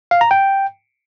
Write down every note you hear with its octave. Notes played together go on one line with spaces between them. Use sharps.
F5
A#5
G5